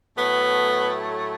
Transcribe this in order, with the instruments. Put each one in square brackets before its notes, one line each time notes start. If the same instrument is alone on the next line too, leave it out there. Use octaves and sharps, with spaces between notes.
[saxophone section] A2 F#3 A3 B3